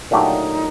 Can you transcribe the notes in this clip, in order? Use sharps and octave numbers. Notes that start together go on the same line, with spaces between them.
A#2 F#3 A3 D4 D#4 F4 G4